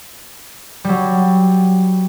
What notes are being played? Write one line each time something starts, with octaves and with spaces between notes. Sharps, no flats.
F#3 G3